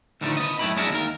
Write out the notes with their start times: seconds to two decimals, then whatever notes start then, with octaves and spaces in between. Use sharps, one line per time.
0.21 D2 A2 D3 D#3 F3 A3
0.37 B4 D#5
0.59 F#2 A2 A3 E4 G4 B5
0.76 G#3 C#4 D4 E4 F#4 A#4
0.91 D#2 A#4